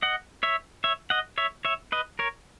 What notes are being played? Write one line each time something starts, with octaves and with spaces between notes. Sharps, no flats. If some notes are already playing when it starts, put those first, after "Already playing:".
D#5 F#5
C#5 E5
C#5 E5
D#5 F#5
C#5 E5
C#5 E5
B4 D#5
A#4 C#5